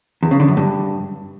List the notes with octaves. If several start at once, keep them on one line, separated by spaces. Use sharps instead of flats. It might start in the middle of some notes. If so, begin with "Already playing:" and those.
E2
C#3
D3
F#2
G2